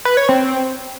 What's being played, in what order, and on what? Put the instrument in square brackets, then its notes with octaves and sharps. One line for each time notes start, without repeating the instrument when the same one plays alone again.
[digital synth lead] B4
C#5
C4